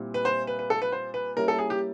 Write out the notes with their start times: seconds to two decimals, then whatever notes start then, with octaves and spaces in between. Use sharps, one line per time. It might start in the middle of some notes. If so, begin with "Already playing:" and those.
Already playing: A#2 G3 C4 E4
0.14 B4
0.25 C5
0.47 B4
0.59 B4
0.70 A4
0.82 B4
0.92 C5
1.14 B4
1.36 G3 A#3 C#4 E4 A#4
1.48 A4
1.59 G#4
1.70 G4